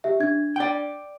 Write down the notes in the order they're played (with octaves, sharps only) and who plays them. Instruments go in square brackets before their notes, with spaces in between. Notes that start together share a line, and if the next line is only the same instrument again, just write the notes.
[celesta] G4 E5
D4 G#6
[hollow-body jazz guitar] D5 G5